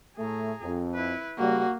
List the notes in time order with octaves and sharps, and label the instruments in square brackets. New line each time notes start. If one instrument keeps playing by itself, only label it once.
[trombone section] A2 A3 [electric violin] G#4 A#5
[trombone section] F2
[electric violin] E4 B4
[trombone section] C#3 G3 [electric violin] A#3 [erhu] F#4